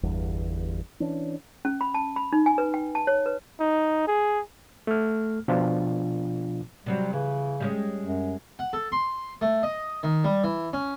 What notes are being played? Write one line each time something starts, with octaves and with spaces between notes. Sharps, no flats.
G1 E2 G2
E3 C#4 D4
C#4
B5
A5
B5
D#4
G#5
B4
G5
A5
C#5
B4
D#4
G#4
A3 F6
B2 F3 D4 F4
C3 F#3 G3 C4
C#3 E3
G3 G#3 C#4
F#2
F#5
A4
C6
A3
D#5
D#3
G3
E3
C#4